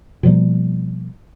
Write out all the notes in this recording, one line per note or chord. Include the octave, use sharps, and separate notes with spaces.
B2 F3 G3 A#3